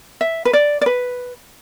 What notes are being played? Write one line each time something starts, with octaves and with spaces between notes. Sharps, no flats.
E5
B4
D5
D5
B4